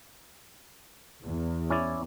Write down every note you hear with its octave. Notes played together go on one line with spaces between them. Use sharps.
E2
C#4 E4 D5